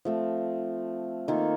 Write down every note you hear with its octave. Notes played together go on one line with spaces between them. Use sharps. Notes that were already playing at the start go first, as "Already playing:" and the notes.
F3 A3 C4
D#3 A#3 F4 A4